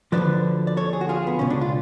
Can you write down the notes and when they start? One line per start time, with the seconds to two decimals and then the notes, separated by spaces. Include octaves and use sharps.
0.12 D2 D3 F3 B4 D5
0.67 D5
0.77 A4 C#5
0.93 G#4
1.01 F#4
1.09 F4 G#4
1.27 B3
1.39 C#2 B2 C#4
1.50 D4
1.61 F4